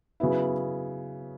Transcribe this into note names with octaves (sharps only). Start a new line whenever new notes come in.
C#3 F#3 B3 E4